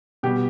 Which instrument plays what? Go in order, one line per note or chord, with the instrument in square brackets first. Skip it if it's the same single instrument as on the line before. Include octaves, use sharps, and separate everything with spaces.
[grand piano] B2 G3 B3 G4